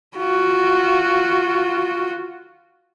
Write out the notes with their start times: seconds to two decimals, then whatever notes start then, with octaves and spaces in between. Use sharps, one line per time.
0.17 F4 F#4